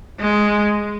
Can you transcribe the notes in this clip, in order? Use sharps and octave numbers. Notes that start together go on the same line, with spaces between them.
G#3